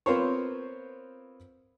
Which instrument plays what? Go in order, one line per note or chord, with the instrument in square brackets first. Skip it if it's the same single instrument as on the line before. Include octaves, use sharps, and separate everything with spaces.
[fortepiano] B3 C4 F4 A#4 C5 C#5